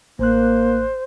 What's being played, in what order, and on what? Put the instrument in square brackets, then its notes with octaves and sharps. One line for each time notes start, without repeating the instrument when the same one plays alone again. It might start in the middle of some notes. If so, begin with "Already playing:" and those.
[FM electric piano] A1 F#6 [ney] A#3 [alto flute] C5